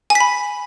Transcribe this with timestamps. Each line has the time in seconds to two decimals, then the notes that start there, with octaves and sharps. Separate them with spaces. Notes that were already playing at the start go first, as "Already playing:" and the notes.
0.10 G#5
0.15 B6
0.20 B5